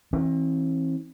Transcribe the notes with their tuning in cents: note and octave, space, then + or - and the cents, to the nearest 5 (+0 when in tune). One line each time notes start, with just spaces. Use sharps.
E3 -25 C4 +40